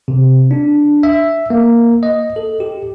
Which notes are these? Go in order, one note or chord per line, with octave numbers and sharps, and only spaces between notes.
C3
D4
E5
A#3
D#5
A4
G4